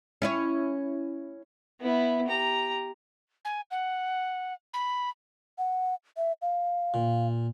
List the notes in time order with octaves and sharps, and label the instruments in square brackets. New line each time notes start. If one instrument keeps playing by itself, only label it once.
[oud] C#4 E4 C#5
[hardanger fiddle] B3 E4
G4 A#5
[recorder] G#5
F#5
B5
[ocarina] F#5
E5
F5
[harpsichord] A#2